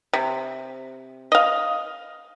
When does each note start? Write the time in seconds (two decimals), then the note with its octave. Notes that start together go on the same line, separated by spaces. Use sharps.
0.13 C3
1.32 D#5 F5